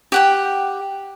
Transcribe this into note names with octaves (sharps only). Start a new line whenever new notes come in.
G4 F#5 G5